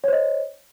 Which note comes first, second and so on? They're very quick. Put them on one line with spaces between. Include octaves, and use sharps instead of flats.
C#5 C5 D#5